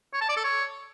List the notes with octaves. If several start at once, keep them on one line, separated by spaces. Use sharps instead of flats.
C#5
A5
D5
A4
C#5